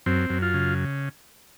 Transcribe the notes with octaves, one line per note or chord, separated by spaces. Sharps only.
F#2 C4
F#2
F4
C#3